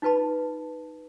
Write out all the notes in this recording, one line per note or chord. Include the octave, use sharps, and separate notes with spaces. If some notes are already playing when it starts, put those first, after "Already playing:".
D#4 F4 B4 A5 B5